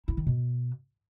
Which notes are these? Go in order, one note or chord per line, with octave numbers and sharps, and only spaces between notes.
E4
D#3
B2